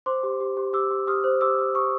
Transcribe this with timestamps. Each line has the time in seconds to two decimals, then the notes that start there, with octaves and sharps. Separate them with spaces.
0.06 C5 C6 D6
0.23 G4
0.40 G4
0.57 G4
0.73 G4 D6 E6
0.91 G4
1.07 G4 D#6 F6
1.24 C5
1.41 G4 D6 E6
1.58 G4
1.75 G4 C#6 D#6